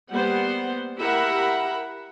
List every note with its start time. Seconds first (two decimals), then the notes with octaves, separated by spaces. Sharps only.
0.12 G3 A#3 B3 C5 F#5
0.98 E4 G4 A#4 E5 F#5 B5